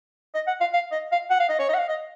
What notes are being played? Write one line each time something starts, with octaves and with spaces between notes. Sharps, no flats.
D#5
F#5
F5
F5
D#5
F5
F#5
F5
D#5
C#5
D#5
F#5
F5
D#5